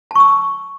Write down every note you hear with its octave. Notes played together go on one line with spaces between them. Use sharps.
A5 C#6 E6